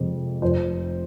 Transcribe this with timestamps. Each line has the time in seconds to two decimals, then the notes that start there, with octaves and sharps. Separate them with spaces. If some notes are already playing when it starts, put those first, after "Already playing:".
Already playing: F2 C3 G#3
0.42 F1 F2 F3 C5